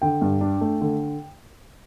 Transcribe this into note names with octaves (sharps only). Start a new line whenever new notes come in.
D3 G5
G2
D4
A3
D3